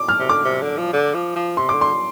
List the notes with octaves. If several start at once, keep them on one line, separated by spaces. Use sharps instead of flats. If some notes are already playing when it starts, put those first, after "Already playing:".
Already playing: D6
F6
C3
D3 D6
C3
D3
F3
D3
F3
F3
C3 C6
D3 D6
C6